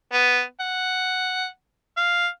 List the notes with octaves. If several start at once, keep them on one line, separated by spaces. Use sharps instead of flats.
B3
F#5
F5